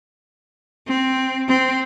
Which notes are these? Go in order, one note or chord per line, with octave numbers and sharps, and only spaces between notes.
C4
C4